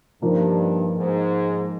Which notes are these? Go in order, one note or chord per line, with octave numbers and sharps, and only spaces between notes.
G2 F3 A#3 D#4
G#2